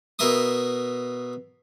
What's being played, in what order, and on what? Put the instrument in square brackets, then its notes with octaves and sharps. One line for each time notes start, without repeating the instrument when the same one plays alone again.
[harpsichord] B2 E4 A#4 E5 C6 D#6